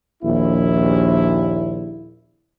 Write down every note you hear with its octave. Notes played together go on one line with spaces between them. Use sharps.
A#1 D#2 E4